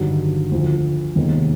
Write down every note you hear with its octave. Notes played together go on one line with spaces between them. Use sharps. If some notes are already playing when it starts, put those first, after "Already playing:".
Already playing: G1 G2 D#3 F#3
D2 D3 F3
F1 D#2 D#3 G#3 B3